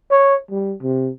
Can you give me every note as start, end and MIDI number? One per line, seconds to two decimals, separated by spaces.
0.11 0.35 73
0.51 0.73 55
0.82 1.10 48